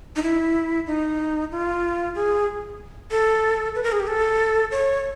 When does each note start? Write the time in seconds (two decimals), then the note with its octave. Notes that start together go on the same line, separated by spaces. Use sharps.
0.16 D#4
0.22 E4
0.87 D#4
1.52 F4
2.15 G#4
3.11 A4
3.75 B4
3.84 A#4
3.92 G#4
4.00 G4
4.07 A4
4.71 C#5